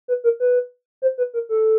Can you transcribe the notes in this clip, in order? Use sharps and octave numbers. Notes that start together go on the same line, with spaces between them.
B4
A#4
B4
C5
B4
A#4
A4